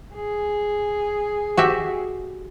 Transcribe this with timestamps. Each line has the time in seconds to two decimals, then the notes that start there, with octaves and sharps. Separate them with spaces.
0.15 G#4
1.57 F#4 G4 E5